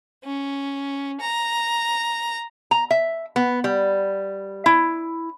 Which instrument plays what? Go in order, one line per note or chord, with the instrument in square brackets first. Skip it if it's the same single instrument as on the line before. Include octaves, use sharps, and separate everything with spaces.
[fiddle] C#4
A#5
[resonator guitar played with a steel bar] A#5
E5
B3
G3
E4